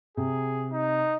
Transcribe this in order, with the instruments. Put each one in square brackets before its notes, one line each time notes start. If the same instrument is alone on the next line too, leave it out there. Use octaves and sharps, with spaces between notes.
[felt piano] C3 [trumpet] G#4
[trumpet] D#4